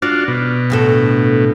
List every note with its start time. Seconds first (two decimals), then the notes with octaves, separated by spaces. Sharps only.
0.02 D4 F4 F#4 D5
0.28 B2
0.70 D2 A2 A4